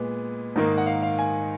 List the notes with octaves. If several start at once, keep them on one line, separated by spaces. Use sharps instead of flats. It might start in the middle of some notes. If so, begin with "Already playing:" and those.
Already playing: A#2 G#3 B3
G#2 D#3 A#3
F#5
F5
F5
G#5